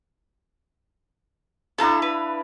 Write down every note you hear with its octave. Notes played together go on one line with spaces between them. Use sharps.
D4 E4 A4 F5 A5 A#5
B4